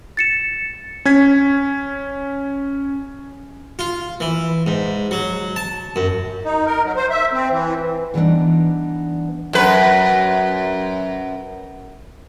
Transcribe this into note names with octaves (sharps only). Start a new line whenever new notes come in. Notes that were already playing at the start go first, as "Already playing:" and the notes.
A6 C#7 E7
C#4 G#6 B6
F4
E3
G#2
F#3
A5
F#2
D#4
A#4
F#3
C5
E5
C4
E3
D3 E3 G3 B3 D4 D#4
F#2 B4